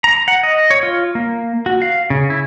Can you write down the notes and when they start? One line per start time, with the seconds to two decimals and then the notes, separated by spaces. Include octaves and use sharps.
0.04 A#5
0.28 F#5
0.43 D#5
0.70 C#5
0.83 F4
1.15 A#3
1.66 F#4
1.82 F5
2.10 C#3
2.30 E4